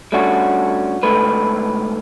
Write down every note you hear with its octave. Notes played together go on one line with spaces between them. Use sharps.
G3 A3 C#4 D4 F#4
D2 G#2 A3 B4